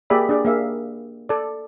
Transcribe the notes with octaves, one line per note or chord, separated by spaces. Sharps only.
A#3 G4 G#4 D5 E5 B5
D4 G#4 D5
A#3 G#4 E5 F5
A4 D5